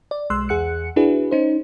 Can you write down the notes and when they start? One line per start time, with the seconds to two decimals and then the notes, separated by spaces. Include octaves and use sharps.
0.11 D5
0.30 B1 G#3 C6 E6 F#6
0.49 E2 G#4 F#5 F#6 C#7
0.96 D4 E4 F#4 G#4 B4
1.31 C#4 D#4 C5